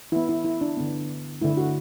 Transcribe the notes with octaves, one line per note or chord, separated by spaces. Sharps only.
E3 B3 E4
E4
E4
D4
D3 B3
D3 A3 E4
F#4